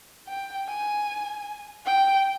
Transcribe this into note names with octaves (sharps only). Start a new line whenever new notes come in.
G5
G#5
G5